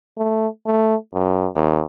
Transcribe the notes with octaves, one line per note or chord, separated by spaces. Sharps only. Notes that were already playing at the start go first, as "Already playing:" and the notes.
A3
A3
F#2
D#2